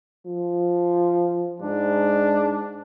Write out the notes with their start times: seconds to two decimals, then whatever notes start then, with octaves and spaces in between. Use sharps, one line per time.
0.26 F3
1.60 G#2 D4